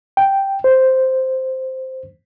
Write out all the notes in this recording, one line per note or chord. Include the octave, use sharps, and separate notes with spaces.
G5
C5